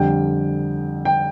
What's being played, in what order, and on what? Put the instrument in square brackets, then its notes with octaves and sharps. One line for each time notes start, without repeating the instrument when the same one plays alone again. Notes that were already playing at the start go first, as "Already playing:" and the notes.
Already playing: [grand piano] F2 D3 G3 G5
G5